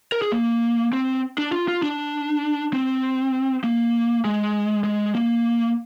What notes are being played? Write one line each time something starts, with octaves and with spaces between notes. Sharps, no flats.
A#4
G#4
A#3
C4
D4
F4
F4
D4
C4
A#3
G#3
G#3
A#3